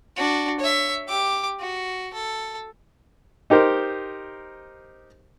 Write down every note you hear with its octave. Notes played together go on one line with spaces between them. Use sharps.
D4 F#4
C#5 E5
G4 D6
F#4
A4
D#4 G4 A#4 C5